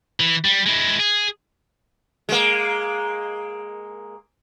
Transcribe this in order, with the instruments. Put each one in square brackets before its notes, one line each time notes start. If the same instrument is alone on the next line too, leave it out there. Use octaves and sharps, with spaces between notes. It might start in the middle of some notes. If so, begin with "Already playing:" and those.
[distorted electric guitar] E3
G3
G#3 E4
G#4
[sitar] G#3 A#3